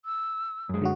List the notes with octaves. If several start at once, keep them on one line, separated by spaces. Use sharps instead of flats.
E6
F#2 G#3
D3 F#3 F#4